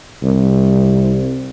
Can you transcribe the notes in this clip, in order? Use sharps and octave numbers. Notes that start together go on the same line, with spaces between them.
C2